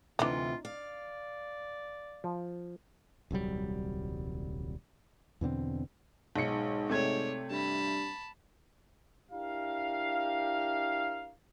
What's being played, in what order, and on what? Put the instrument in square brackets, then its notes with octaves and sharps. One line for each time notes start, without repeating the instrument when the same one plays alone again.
[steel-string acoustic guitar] D2 C3 E3 [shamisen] D4 D#4 [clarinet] F4
[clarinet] D5 [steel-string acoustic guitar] F5
[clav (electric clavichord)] F3
[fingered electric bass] D#1 C2 F#3 G3
E2 B2 D3 C4
[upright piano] B1 C#7 [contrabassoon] G#2
[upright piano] C3 A3 G#6 [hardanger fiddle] C#5 D5
[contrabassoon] G2 [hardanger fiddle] A5 B5
[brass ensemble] D4 E4 G4 A#4 F5